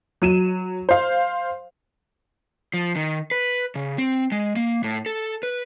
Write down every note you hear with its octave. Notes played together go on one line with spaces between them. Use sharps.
F#3 D#7 E7
C5 F5
F3
D#3
B4
C#3
C4
G#3
A#3
A2
A4
B4